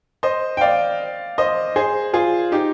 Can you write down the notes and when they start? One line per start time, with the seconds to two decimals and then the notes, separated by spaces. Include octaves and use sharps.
0.23 C5 D#5
0.57 G5
0.61 D5 F5
1.38 C5 D#5
1.76 G#4 C5
2.13 F4 G#4
2.52 D#4 G4